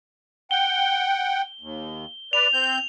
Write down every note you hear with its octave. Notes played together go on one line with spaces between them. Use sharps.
F#5 G5 G7
D#2
B4 D5 F7
C4 G6